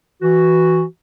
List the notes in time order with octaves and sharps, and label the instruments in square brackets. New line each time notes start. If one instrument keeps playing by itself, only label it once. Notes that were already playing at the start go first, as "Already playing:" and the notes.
[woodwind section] E3 F#4